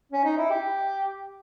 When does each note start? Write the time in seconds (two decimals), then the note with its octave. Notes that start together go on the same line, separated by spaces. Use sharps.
0.12 C#4
0.24 D#4
0.37 E4
0.50 G4